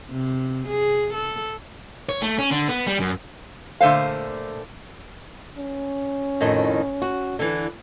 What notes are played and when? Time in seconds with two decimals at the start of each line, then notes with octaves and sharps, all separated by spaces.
0.11 C3
0.68 G#4
1.13 A4
2.09 C#5
2.22 A3
2.39 C#4
2.51 D3
2.68 B3
2.87 G3
3.00 F#2
3.81 A#2 D3 A3 C5 F5
5.58 C#4
6.41 F2 A2 D#3
7.02 F#4
7.39 D3 E3